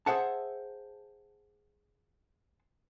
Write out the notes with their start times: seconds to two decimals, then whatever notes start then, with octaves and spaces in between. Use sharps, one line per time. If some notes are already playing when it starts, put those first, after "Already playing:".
0.06 G#4 C5 E5 F#5 A5